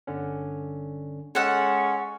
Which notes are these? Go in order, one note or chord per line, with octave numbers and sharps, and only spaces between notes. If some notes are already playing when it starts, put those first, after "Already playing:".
G1 D3 C#4
G#3 C#4 A4 C#5 F#5 E6